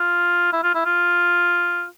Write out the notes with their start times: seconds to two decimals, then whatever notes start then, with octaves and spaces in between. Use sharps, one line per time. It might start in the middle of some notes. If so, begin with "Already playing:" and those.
Already playing: F4
0.53 E4
0.63 F4
0.75 E4
0.85 F4